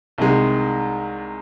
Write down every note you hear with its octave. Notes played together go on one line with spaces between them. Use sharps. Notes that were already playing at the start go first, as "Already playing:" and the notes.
C2 C3 D#3 G#3